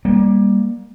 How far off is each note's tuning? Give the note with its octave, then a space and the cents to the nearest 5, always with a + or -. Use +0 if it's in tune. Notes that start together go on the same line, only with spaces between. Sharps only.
G3 +20 A#3 +25